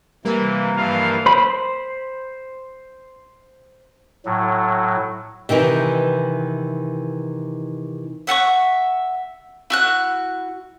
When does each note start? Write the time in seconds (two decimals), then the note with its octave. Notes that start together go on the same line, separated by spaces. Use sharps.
0.25 C3 E3 G3 A#3
0.76 G2 E3 F3 F5
1.26 C5 B5
4.25 A2 F#3
5.49 C3 D#3 E3 D#4
8.27 E5 F#5 A5 C#6
9.70 E4 F#4 F#6